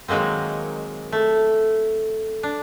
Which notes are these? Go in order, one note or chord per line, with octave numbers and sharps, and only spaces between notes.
D#3 F#3 G#3 A#3 C4
A3
D4